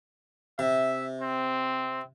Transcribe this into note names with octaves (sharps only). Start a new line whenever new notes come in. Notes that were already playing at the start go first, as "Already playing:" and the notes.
C3 E5
C4